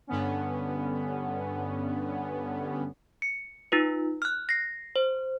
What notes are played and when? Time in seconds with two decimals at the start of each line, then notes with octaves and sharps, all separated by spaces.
0.07 G2 D3 B3 C#4
3.22 C#7
3.72 D#4 F4 B4
4.22 F6 F#6
4.49 A#6 C7
4.96 C5